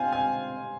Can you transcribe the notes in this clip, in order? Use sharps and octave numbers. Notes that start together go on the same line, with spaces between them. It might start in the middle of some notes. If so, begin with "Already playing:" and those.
Already playing: C4 F4 C5 F5 G#5
G#5